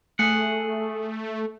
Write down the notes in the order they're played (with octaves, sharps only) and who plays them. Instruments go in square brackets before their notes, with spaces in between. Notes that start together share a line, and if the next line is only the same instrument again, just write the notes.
[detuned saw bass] A3 [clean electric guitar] G#4 F#5